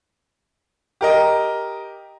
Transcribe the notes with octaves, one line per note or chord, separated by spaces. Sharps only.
G4 A#4 D#5